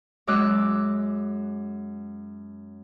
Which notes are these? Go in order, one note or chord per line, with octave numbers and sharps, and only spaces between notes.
F#2 G#3 D6 E6 F#6